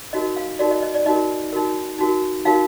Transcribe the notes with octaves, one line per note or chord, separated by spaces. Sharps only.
D#4 F#4 A#4 D#5
F5
D#4 F#4 A#4 D5
D#5
D#5
D5
D#4 F#4 A#4 D#5
D#4 F#4 A#4
D#4 F#4 A#4
D#4 F#4 A#4 F5